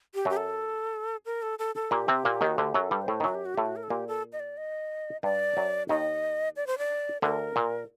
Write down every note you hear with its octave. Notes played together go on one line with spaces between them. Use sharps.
G4
F#2 F#3 G4
A4
A#4
A4
A4
A4
A#2 A#3 G4
C3 C4
A#2 A#3
D#2 D#3
F#4
D2 D3 G4
F#2 F#3
A4
G2 G3
C5
A2 A3
D#3
F#2 F#3 F#4
G4
F#4
A2 A3 G4
F#4
A#4
A4
A#2 A#3 G4
A4
D#5
D5
D#5
G2 G3 D5
F#2 F#3
D#2 D#3 D#5
D5
C5
D5
D2 D3 A#4
A#2